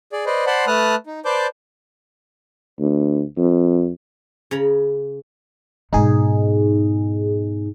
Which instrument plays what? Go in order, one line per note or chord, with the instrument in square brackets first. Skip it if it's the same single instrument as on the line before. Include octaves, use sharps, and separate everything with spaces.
[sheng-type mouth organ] G#4 D5
B4 C5 D5 D#5
C5 D5 F#5 A5 B5 C6
A3 B4 A5 D#6 F6 F#6
D#4
B4 C5 D5 A5 D6 G6
[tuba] D2
F2
[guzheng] C#3 C#5 A#5 B5
[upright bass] G#2 B2 [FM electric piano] D#4 G#4